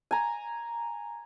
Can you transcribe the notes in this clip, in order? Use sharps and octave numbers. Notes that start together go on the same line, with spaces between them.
G#5 A#5